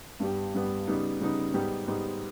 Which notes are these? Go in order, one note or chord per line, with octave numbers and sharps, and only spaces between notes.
G2 G3 B3 G4
G2 G3 B3 G4
C#3 G3 B3 D#4
C#3 G3 B3 D#4
G#2 G3 B3 D#4 G4
G#2 G3 B3 D#4 G4